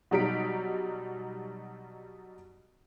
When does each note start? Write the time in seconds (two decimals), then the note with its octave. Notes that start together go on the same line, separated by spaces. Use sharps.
0.11 B2 F#3 G3 D#4 B6 D7